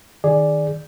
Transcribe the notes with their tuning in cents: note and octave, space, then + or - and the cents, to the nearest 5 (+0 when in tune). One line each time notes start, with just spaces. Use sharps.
D#3 +0 G#4 +0 D5 +0